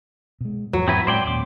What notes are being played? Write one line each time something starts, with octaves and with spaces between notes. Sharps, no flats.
B2 G#3
E2 G#2 F3 F#3
C4 E4 B4
A2 G#3 C#4 C5 D5 G5
D#2 A#2 C#4 D6